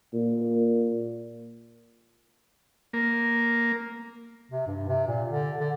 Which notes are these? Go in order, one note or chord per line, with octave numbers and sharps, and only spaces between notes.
A#2
A#3
C3
G2
C3
A#2
D3
D3